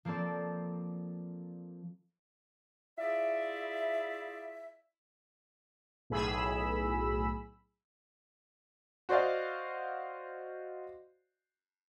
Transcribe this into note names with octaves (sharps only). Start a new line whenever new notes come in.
F3 A#3 C4 A4 D5
E4 F4 G#4 D5 E5
B1 A2 G#4 B5 E6
F#4 C5 D5 D#5 F5